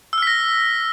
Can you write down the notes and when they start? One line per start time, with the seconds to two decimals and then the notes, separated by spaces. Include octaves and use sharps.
0.13 E6
0.18 F6
0.22 B6
0.27 A#6